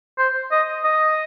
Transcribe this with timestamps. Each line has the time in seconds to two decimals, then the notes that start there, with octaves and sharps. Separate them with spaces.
0.18 C5
0.51 D#5
0.84 D#5